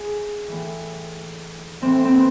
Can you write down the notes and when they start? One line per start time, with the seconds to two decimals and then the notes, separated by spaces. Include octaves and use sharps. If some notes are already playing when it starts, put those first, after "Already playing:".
Already playing: G#4
0.48 A2 E3
1.81 A2 E3 C4
2.05 C4
2.15 B3